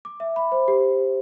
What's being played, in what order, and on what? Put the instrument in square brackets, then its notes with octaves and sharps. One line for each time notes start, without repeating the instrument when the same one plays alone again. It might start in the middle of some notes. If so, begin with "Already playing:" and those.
[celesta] D6
E5
B5
C5
G4